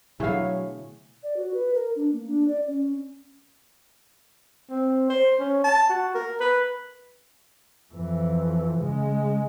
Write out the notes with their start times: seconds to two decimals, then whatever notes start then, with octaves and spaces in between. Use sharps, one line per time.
0.20 B2 D3 F#3 A3 E4 G#4 C#5 F5
1.23 D5
1.37 F#4
1.54 B4
1.75 A#4
1.96 D4
2.13 A#3
2.27 D4
2.48 D5
2.68 C#4
4.70 C4
5.10 C5
5.39 C#4
5.64 A5
5.89 F#4
6.14 A#4
6.40 B4
7.94 F2 E3
8.79 C#3 G#3